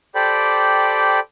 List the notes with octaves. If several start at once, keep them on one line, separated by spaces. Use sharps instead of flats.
G4 A4 C5 D5 G5 B5